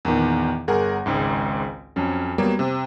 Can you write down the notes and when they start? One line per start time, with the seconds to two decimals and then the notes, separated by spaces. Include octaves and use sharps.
0.05 E2 A#2 D#3
0.68 G1 G#4 A#4 F#5 A#6
1.06 G#1 C#2 G#2
1.96 F2 F#3 C#4
2.38 F#3 G3 A#3 B3
2.59 C3